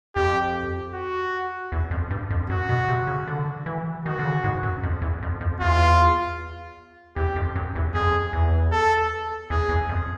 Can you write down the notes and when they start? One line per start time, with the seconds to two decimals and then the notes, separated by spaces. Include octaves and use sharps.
0.16 F2 G4
0.94 F#4
1.72 E2
1.91 F2
2.11 G2
2.30 F2
2.49 F#2 F#4
2.69 B2
2.88 C3
3.07 C#3
3.27 D3
3.66 E3
4.05 D#3 F#4
4.19 D3
4.24 C#3
4.44 G#2
4.63 F#2
4.83 F2
5.02 E2
5.22 F2
5.41 F2
5.60 E2 F4
7.16 E2 G4
7.36 F2
7.55 F#2
7.76 E2
7.94 F2 G#4
8.33 E2
8.72 A4
9.50 E2 G#4
9.69 E2
9.89 F2